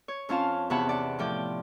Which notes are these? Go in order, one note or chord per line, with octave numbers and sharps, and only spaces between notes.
C#5
F2 C#4 F4 F5 A5
E2 C3 C#5 F#5 A5 B5
D5 F#5
A2 F3 G5 D6